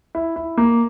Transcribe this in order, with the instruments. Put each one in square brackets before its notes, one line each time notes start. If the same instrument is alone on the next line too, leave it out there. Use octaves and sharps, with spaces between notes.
[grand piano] E4
E4
A#3